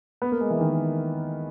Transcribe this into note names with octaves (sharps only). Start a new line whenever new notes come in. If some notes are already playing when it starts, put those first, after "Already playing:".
B3
A#3
G#3
E3
D#3